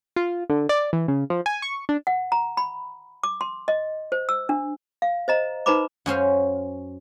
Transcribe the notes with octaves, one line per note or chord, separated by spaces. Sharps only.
F4
D3
D5
E3
C#3
F3
G#5
C#6
D4
F#5
A#5
B5
D6
C6
D#5
C5
E6
D4
F5
C5 D#5 A#5
D#4 B4 C5 A#5 B5 D6
F#2 C#4 C5 F5